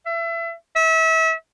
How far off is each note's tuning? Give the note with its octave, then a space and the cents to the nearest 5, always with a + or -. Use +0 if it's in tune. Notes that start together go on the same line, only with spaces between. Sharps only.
E5 +30
E5 -30